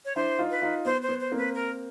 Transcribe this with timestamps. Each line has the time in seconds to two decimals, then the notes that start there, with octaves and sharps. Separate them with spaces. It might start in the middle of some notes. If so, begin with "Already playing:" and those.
0.05 C#5
0.16 D4 E4 C5
0.39 D#4 F4
0.51 B4
0.62 D#4 F4
0.85 B3 C5
1.02 C5
1.09 B3
1.20 C5
1.32 A#3 C4
1.37 B4
1.55 A#4